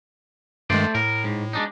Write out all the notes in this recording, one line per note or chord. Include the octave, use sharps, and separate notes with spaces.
G2 D#3 G#3 A3 C5 D5
A2 A#4
G#2
G#3 D4 D#4